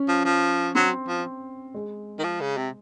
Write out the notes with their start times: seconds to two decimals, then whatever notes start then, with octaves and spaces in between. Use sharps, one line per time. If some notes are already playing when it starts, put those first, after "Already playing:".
Already playing: C#4
0.08 F3
0.25 F3
0.75 F#3 C4
1.08 F3
1.74 G#3
2.19 D#3
2.24 F3
2.41 C#3
2.57 C3